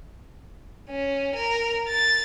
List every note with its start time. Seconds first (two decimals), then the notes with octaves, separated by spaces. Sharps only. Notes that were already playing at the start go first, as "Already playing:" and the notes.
0.90 C#4
1.35 A#4
1.88 A6